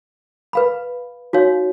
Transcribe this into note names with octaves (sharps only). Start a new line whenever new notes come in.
B4 F5 B5
D#4 F#4 C#5 F5